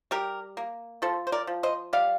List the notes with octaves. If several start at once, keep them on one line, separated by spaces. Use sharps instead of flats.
G3 G4 A#4
A#3
F3 A4 C5
C5
A#4 D5
F3
C5 D#5
G3 D5 F5